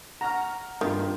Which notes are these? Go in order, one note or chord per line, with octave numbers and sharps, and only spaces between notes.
F#5 A#5 C#6 F6
G2 D#3 D#4 F4